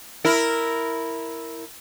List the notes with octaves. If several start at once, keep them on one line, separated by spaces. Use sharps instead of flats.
E4 A#4